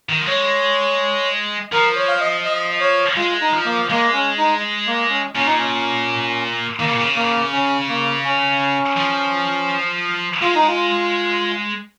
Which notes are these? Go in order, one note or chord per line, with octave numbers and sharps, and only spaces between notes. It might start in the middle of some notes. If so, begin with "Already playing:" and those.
D#3
F3
G#3 C#5
F3 A#4
C#5
F5
D#5
D#5
C#5
G#3 F4
D#4
F3
A#3
G#3 A#3
C#4
D#4
A#3
C#4
A#2 C#4
D#4
C#4
D#3 A#3
C#3
A#2
C#3
A#3
C#4
A#3
C#4
F3
G#3 F4
D#4
F4